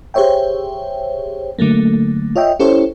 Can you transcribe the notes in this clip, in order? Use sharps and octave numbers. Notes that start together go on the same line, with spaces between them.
G4 G#4 C5 C#5 E5 G5
D3 F#3 A3 A#3
F4 C#5 D#5 E5 G5
C#4 E4 G4 A4 C5 C#5